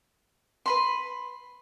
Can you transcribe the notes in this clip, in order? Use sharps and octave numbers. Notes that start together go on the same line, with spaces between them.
B4 B5 C6